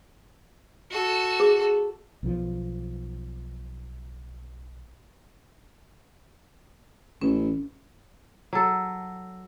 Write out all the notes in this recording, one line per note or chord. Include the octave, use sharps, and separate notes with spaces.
F#4 A4
G#4
B1 B2 F3
A1 C#4
F#3 A4